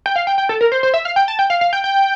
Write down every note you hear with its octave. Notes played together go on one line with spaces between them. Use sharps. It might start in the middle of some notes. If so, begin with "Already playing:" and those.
G5
F5
G5
G5
A4
A#4
C5
C5
E5
F5
G5
A5
G5
F5
F5
G5
G5